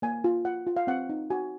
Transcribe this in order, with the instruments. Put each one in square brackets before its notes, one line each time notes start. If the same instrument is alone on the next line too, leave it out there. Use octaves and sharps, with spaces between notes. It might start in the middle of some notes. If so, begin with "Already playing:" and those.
[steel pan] A#3 G#5
F4
F4 F#5
F4
F5
C4 F#5
D#4
F#4 G#5